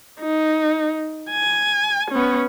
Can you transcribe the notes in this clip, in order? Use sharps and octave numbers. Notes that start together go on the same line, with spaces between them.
D#4
G#5
B3 C#4